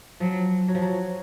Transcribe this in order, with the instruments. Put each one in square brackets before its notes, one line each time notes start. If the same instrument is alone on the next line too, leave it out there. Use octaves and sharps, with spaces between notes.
[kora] F3 [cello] F#3
[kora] F#3
F3
F#3